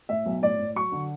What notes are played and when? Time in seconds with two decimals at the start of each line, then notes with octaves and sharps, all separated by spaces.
0.09 A2 E5
0.26 B1
0.42 A2 D5
0.59 A2
0.76 F#3 C#6
0.92 D3